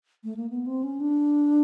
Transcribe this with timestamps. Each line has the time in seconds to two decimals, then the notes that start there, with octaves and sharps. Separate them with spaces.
0.24 A3
0.37 A#3
0.50 B3
0.66 C4
0.83 C#4
1.00 D4